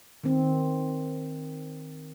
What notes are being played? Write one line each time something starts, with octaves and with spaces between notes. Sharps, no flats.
D#3 C4